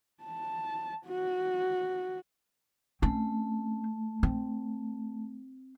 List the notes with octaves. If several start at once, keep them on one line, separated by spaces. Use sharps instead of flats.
A5
F#4
A3 C4 C#4
C4